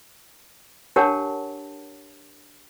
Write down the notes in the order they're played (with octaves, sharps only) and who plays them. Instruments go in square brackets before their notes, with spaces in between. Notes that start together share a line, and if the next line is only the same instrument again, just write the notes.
[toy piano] D4 G4 A#4 C#5 F#5 A5